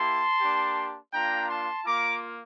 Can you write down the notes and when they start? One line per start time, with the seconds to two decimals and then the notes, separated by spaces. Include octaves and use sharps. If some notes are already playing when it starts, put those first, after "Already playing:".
Already playing: A#3 E4 G4 A5 C6
0.40 A#3 D4 G4
1.12 A#3 D4 F4 G5 A#5
1.49 A5 C6
1.85 A#3 F4 A#5 D6